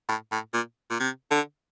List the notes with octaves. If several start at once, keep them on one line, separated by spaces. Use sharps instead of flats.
A2
A2
A#2
A#2
C3
D3